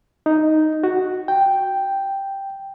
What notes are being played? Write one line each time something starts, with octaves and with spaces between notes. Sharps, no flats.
D#4
F#4
G5